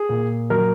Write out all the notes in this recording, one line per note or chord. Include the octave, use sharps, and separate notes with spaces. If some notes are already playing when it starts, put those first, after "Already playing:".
Already playing: G#4
A#2
F#3 A#4